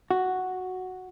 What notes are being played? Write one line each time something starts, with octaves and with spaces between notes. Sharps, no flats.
F#4